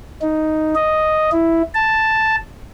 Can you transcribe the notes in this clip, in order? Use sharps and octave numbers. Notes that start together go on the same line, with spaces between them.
D#4
D#5
E4
A5